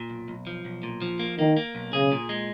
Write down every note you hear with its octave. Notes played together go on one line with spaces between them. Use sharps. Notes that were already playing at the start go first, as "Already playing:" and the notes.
Already playing: A#2
B1
B1
F3
B1
A#2
F3
A#3
D#3 A#3
A#3
B1
C#3 G#4
A#2
G#3